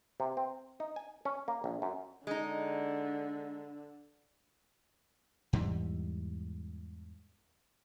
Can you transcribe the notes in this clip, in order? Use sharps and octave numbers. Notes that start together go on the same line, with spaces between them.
C3
C4
D#4
G#5
C#4
A#3
A#1
F#2
D3 G#3 D#4
E2 G#2 E3 G3